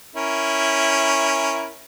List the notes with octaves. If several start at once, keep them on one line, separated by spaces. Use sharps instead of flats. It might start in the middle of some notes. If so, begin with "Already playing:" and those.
C#4 E4 A#4